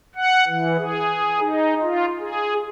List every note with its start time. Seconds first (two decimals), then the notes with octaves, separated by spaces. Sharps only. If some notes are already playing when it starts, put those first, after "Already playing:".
0.16 F#5
0.47 E3
0.78 G#4
1.40 D#4
1.82 F4
2.20 G#4